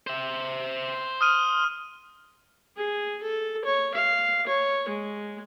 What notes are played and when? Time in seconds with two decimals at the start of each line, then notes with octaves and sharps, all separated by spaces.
0.07 C5 E5
1.21 D#6 F6 D#7
2.77 G#4
3.22 A4
3.65 C#5
3.95 F5
4.47 C#5
4.89 G#3